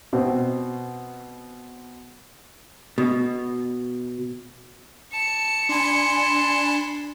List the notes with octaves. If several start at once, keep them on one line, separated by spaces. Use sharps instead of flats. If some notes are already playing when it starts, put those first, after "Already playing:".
B2 C4
B2
A5 C#7
D4 G#5 B5 C6